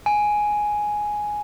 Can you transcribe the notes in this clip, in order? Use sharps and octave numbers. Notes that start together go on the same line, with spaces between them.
G#5